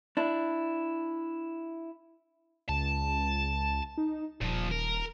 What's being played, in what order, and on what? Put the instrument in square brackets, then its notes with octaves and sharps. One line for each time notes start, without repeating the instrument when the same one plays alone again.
[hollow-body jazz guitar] D4 E4
[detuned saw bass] C#2 [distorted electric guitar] A5
[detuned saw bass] D#4
[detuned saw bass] D#1 [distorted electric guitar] A#2 F3
[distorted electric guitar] A#4